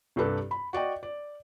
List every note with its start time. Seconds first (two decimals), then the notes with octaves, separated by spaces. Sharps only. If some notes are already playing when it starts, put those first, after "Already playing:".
0.16 C2 G2 G4 A4 B4
0.51 B5
0.73 F#4 D5 D#5 G5
1.03 D5